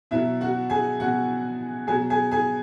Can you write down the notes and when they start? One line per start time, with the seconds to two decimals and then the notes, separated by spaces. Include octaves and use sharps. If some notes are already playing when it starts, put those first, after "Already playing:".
0.11 B2 F#3 E4 E5
0.41 F#4 F#5
0.70 G#4 G#5
1.00 B2 F#3 F#4 F#5
1.87 B2 F#3 G#4 G#5
2.10 G#4 G#5
2.31 G#4 G#5